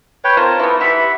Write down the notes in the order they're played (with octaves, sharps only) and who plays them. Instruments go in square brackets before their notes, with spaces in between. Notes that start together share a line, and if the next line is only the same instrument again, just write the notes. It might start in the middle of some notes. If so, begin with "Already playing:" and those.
[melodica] B4 C#5 G5
[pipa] C4 A#4 [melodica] F4 A5
[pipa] E3 A3 B3
[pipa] E3 G3 [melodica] E5 F#5 B5